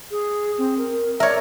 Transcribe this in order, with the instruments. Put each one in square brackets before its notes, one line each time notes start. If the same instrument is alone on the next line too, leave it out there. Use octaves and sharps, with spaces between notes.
[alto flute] G#4
C4
A#4
[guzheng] A#4 C#5 [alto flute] D5 [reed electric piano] E5